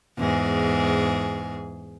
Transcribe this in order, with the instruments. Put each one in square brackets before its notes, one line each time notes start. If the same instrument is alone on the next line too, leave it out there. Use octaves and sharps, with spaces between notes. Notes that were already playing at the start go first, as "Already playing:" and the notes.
[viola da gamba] E2 G#2 G#4